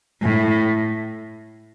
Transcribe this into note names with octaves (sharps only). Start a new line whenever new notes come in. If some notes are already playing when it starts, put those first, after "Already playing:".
A2